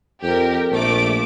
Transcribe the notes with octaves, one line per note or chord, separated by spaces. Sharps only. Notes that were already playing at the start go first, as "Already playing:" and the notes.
F2 G4 A#4
A#1 A3 D6